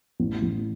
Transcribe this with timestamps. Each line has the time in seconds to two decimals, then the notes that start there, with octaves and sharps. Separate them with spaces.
0.20 A1
0.42 A1